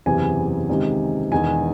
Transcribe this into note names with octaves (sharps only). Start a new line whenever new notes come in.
F#1 E2 C3 E3 G#5
C#2 C3 D#3
E1 E2 D#3 G#5